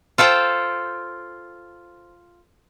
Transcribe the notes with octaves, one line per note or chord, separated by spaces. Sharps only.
F4 A4 C5 G5